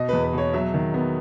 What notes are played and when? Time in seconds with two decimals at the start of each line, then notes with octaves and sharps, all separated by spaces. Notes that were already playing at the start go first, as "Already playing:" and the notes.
Already playing: B2 D#5
0.09 E2 B4
0.23 B4
0.33 B2 C#5
0.53 F#3 E5
0.74 D#3
0.94 B3